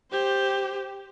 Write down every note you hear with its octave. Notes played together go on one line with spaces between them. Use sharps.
G4 C5